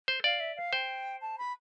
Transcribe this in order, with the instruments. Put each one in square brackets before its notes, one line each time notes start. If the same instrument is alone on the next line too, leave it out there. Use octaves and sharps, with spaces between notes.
[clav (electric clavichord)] C5
[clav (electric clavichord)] D5 [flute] F5
[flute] E5
F5
[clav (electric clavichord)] C5 [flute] G5
[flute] A5
B5